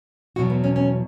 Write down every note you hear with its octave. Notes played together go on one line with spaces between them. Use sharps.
E2 B2 F#3 F#4
B3
C#4
C#4